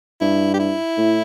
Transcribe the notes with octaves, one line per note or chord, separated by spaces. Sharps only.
G2 E4
G4
E4
A2